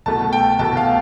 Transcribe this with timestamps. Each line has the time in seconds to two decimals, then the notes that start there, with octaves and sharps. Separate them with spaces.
0.06 C2 B2 A3 A5
0.33 G5
0.59 C2 B2 A3 A5
0.77 F5